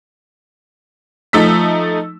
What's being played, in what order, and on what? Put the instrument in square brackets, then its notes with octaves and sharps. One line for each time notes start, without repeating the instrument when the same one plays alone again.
[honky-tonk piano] F3 A3 D#4 E6 B6